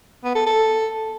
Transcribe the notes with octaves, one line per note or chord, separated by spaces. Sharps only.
B3
A4
A4